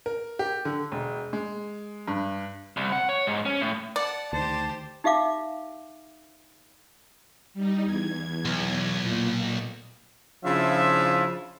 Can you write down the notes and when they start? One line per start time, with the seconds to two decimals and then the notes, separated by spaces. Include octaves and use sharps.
0.06 A#4
0.39 G4
0.65 D3
0.92 E1
1.33 G#3
2.08 G2
2.77 C2
2.92 F#5
3.09 C#5
3.27 G#2
3.46 C#4
3.61 A2
3.96 D5 F#5 A5
4.33 D2 D#3 G4 C5 A5
5.04 D#4 G4 E5 F5 D6
7.54 G3 D#4
7.85 E2 G#6
8.45 B1
9.00 A#2
10.45 C#3 F3 D4 E4 F4 E5